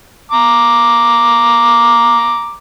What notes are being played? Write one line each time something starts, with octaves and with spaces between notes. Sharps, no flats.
A#5 D6